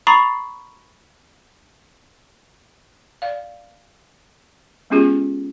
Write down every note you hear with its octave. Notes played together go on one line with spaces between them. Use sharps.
A#5 B5 C#6 D#6 A6 C7
D5 F5
G#3 B3 C#4 F4 G4 G#4